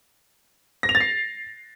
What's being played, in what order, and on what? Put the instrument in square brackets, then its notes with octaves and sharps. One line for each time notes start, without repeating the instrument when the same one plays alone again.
[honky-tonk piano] A#6
F7
A6
C7